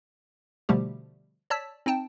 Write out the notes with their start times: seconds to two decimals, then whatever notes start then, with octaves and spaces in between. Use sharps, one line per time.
0.69 B2 D3 F3 G3 A3 G4
1.50 C#5 D5 A5 E6 B6
1.86 C4 D#4 G5 A5